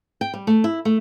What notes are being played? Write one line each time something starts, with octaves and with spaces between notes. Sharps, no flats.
G5
G3
A3
E4
A3